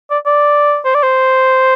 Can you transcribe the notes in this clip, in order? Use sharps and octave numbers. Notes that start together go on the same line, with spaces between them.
D5
D5
C5
D5
C5